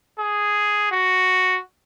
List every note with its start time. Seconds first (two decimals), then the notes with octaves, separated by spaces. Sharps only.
0.19 G#4
0.91 F#4